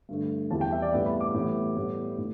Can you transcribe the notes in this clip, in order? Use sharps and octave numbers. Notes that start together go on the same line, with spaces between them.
G2 D3 A3
E2 E3 G3 A5
G5
E5
D5
A2 G3 B3 E5
B5
D6
A2 E3 G3 B3
A2 G3 B3
A2